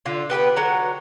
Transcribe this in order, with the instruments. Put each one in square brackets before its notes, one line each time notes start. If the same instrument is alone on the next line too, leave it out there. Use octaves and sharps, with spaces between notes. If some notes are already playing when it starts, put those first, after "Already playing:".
[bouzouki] D3 F4
B3 G4 A4 B4
D3 F#3 F#5 A#5